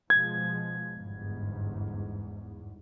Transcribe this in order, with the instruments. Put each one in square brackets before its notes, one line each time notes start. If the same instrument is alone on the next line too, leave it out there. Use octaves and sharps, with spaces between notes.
[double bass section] B2 F3 G#3 [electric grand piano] G#6
[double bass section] G1 E2 G#2